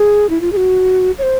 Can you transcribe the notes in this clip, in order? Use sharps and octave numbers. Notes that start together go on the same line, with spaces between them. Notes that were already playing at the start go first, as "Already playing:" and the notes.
Already playing: G#4
E4
F4
G#4
F#4
C#5
C5